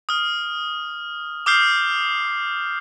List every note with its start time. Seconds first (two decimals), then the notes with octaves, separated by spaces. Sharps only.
0.09 D#6 F6
1.46 D6 D#6 F6 G6 C7